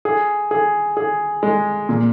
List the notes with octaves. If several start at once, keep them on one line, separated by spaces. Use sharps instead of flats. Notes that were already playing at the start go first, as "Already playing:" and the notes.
G#4
G#4
G#4
G#3
A#2